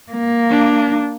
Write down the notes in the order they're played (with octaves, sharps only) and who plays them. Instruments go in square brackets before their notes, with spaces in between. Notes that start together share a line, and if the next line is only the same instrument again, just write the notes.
[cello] A#3
[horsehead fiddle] D4